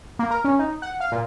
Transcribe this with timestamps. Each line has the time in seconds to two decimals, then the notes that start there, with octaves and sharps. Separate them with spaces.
0.19 A#3
0.31 A#4
0.44 C#4
0.59 D#4
0.82 F#5
1.00 F5
1.12 A#2